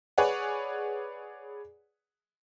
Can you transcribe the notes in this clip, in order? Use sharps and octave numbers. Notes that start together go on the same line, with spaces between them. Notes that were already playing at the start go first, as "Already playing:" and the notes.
G#4 B4 C#5 D5 F#5 G#5